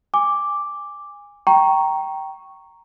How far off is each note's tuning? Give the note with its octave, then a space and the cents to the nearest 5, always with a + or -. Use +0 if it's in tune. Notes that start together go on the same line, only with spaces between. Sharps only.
G#5 -20 D6 +0
G5 -15 A#5 +0 C#6 -5